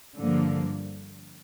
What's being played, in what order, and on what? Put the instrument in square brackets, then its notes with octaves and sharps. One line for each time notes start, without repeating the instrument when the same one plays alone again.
[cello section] G2 D3 F3 A#3